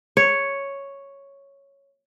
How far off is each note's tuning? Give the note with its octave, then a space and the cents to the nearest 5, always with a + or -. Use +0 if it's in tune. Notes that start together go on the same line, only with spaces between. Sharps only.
C#5 +0